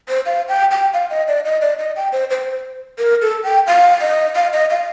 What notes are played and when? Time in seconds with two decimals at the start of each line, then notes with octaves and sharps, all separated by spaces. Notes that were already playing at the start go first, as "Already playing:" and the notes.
0.09 C5
0.26 F5
0.49 G5
0.71 G5
0.94 F5
1.10 D#5
1.28 D5
1.45 D#5
1.61 D5
1.79 D#5
1.96 G5
2.13 C5
2.30 C5
2.99 A#4
3.22 A4
3.44 G5
3.67 F5
4.01 D#5
4.36 F5
4.53 D#5
4.70 F5